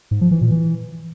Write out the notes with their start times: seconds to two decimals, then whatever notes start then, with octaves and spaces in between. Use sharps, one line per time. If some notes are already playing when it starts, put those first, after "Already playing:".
0.11 G#2
0.21 F3
0.31 E3
0.41 A#2
0.51 E3